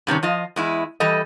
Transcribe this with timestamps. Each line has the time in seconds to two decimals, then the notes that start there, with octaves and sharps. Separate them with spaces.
0.07 G2 C3 D#3 C#4
0.23 F3 F4 D#5
0.56 E2 G#3 E4
1.00 E3 G3 A4 D#5